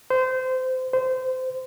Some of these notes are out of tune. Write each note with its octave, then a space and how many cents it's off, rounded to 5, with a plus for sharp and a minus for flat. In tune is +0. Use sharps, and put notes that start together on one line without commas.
C5 -25
C5 -25